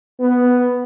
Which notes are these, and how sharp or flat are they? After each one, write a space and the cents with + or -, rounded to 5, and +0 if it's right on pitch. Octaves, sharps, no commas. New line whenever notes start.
B3 +0